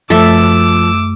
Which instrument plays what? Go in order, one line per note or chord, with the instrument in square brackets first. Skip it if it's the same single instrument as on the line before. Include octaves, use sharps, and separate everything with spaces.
[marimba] F#2 A3 [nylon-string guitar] F3 [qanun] A4 E5 [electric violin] D6 E6